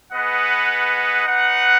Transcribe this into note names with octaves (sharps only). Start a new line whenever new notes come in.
B3 G#4 B4 D#5 F#5
D#4 B4 F#5